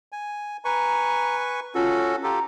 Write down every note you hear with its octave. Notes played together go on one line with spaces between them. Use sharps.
G#5
B4 G#5 A#5 C#6
C#4 F4 F#4 A4
F4 G4 A4 A#5